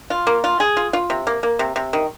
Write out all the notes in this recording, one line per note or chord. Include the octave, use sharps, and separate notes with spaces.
F4
A#3
F4
G#4
F4
F4
C3
A#3
A#3
C3
C3
D#3